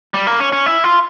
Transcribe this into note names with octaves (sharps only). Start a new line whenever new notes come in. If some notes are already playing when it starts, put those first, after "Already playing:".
G3
A#3
C#4
C#4
E4
F4